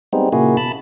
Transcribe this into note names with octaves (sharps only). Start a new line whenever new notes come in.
G3 G#3 B3 C4 D#4
A#2 C#3 A#3 E4 F#4 G#4
B2 A5 B5